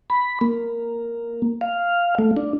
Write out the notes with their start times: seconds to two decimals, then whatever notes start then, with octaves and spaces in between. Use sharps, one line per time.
0.10 B5
0.41 A#3
1.61 F5
2.18 A3
2.37 D4